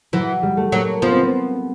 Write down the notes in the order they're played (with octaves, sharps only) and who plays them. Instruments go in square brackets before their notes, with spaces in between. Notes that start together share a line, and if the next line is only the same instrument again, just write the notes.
[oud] E3 [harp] F#3
[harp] G3
A3
[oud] F#3 [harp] A#3
[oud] F3 [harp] B3
[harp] C4
B3